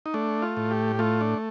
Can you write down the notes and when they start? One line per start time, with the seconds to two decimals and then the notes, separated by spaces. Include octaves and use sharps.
0.06 D#4
0.14 A3 D4
0.42 F4
0.57 A2
0.71 G4
0.99 A3 F4
1.21 D4